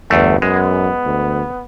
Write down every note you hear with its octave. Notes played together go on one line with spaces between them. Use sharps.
G1 E2 A3
F#2 G#3 B3
D2